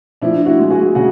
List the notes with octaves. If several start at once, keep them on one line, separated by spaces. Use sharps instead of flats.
F3 D4 E4
E4 F#4
G#3
F#4 G#4
C#3 F#4 G#4